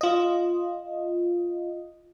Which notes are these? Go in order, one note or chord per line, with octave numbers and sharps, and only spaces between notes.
F4 D#5